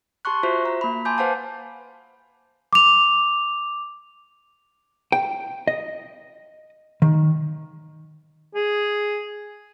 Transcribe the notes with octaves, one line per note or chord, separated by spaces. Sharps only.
G4 A5 C6 C#6 F#6
F4 F#4 C5 E5 B6
A#5
A#3 B5
G#5 A5 C6 D6 G6
B4 C5 F5 F#5 A5
D6 F7
G5
D#5
D#3
G#4